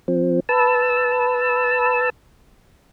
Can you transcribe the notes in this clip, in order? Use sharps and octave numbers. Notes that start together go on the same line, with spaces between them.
F3 C4
B4 A5 E6